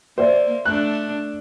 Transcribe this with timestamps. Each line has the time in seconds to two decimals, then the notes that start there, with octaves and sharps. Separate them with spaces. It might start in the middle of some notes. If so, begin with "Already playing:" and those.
0.18 A#3 C5 D5 E5
0.65 A3 D4 F#6